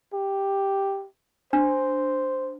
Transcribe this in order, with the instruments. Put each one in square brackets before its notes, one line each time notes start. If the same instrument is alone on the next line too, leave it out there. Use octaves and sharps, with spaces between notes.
[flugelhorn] G4
[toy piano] D4 [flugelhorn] C5